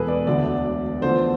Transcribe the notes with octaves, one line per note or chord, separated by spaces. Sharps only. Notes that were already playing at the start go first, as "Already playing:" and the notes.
Already playing: E1 E2 B2 G#3 G#4 A4 B4
D5
E1 D2 D3 G#3 D5
E2 D3 F3 A3 C5